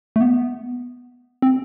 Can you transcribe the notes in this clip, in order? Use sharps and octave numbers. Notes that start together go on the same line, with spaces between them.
A3
B3
C4